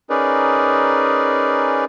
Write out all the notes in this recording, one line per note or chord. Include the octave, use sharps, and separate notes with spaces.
C#4 D#4 G#4 A#4 B4 D5